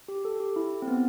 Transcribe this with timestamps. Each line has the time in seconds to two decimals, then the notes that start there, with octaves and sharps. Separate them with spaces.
0.08 G4
0.25 A4
0.40 G4
0.56 E4
0.82 C4
0.88 B3